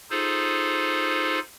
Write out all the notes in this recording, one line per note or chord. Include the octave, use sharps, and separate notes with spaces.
D#4 F4 G#4 A4 C5